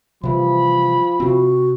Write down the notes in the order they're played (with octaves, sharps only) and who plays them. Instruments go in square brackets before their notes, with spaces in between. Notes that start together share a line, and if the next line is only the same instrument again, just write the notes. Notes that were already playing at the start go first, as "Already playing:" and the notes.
[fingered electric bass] C3 E3 G3 [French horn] F3 [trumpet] B5
[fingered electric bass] C3 C4 [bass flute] F#4